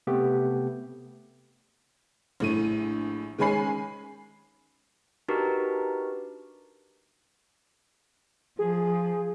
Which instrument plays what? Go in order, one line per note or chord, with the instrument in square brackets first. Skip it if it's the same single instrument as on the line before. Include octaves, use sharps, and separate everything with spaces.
[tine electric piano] C3 A3 B3 G4
[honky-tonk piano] A#1 A2 D#7
D#3 G#3 C#4 G#5 B5 C7
[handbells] D4 D#4 F#4 G4 A#4 B4
[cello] F3 [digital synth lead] G#4